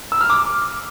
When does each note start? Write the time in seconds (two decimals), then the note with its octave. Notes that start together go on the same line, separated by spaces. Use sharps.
0.12 E6
0.21 F6
0.30 D6